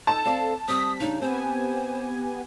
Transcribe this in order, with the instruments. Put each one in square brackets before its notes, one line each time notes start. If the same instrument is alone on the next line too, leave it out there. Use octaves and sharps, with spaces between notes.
[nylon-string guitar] D#4 D#5 [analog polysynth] A4 [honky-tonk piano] A5 E7
[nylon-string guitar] C4 D5 [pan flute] F5
[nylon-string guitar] G3 C4 [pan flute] D#6 [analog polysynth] B6
[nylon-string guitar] C#3 G3 D4 [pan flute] D#4
[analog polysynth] B3 G4 G#5 [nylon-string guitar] C4 [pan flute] C5